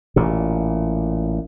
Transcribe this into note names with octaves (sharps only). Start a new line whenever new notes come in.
A1 A#2